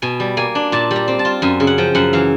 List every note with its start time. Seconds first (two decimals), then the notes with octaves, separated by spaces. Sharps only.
0.02 B2 G#5
0.20 G3
0.37 A#3 G#5
0.55 D4
0.72 A#2 A5
0.91 G3
0.96 A#5
1.08 C4
1.19 A5
1.25 F4
1.42 F#2 G#5
1.60 C#3
1.67 F#5
1.78 F3 G5
1.95 F#2 F#5
2.13 E3 F5